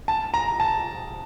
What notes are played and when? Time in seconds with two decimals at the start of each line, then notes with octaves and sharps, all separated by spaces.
0.08 A5
0.34 A#5
0.60 A5